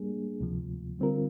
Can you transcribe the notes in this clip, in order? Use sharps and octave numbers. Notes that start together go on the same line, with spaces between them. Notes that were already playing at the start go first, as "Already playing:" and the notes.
Already playing: G3 A#3 D4 G#4
D2 C3 F3
D3 G3 C4 F4 A#4